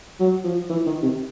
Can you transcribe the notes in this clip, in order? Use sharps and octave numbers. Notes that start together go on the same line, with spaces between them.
F#3
F3
E3
D#3
C3